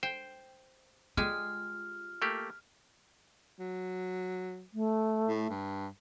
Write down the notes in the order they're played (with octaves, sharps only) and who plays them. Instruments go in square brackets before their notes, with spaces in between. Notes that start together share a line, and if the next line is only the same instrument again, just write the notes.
[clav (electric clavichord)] C5 [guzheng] G5
[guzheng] G#3 G4 G#4 [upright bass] F4 [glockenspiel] F6
[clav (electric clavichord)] A3 A#3 G4
[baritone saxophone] F#3
[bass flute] A3
[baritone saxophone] A2
G2